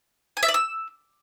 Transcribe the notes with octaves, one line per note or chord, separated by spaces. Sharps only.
G#5
E5
D5
E6